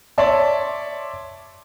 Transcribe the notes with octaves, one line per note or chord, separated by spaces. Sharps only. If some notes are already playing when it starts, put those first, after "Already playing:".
C#5 D5 E5 A5 C6 D6